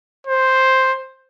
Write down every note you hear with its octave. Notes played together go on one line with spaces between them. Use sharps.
C5